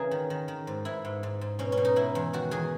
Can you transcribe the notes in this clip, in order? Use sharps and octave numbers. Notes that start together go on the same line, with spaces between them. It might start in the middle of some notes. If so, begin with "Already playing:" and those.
Already playing: C#3 E3 G#4 A#4
D#3
D#3
D#3
G#2
G#2 E4
G#2
G#2
G#2
B2 C#4
C#4
B2
D#4
B2 E4
E2
D#3 F#4
E2 G#4